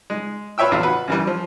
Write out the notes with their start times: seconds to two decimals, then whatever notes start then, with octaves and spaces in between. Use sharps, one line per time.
0.10 G#3
0.58 F4 B4 C#5 E5 G5 E6
0.71 A1 E2 F4 E5
0.83 F#4 B4
1.08 F#2 E3 G3
1.27 F3